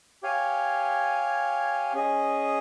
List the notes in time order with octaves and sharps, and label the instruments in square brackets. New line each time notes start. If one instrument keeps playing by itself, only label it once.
[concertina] G4 C#5 F5 G#5
C#4 G#4 D#5